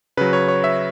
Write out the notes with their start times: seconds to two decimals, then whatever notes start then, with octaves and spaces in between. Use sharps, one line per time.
0.17 C#3 F#3 B4
0.33 C#5
0.48 C#5
0.64 E5